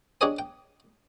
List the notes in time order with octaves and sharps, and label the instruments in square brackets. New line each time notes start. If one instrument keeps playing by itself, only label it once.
[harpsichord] D4 G4 G#4 C#5 D#5 G#5
G5